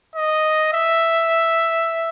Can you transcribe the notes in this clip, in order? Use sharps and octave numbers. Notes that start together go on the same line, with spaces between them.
D#5
E5